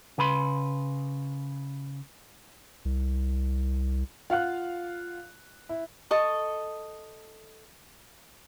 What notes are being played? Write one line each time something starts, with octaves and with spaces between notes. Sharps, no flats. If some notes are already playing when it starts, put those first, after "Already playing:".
C#3 B4 B5 C6
C2
F4 F5 F#5 F#6
E4
A4 D#5 C#6